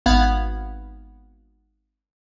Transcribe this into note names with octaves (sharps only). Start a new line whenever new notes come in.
G#1 B3 F5 F#5 B5 G#6